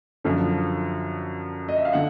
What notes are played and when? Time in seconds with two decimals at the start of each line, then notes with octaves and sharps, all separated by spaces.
0.24 F#2 D3 F3
1.68 D#5
1.76 E5
1.85 F5
1.93 D3 F#5